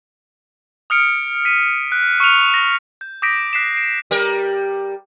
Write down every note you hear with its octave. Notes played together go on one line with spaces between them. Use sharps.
D#6 F6 C#7 D7
B6 D#7
F#6
C#6 F6 C#7 D#7 F7
A#6
G6
D6 D#6 G6 A#6 B6 D7
F#6 B6 C7 D7 E7
C7 D7
G3 A#4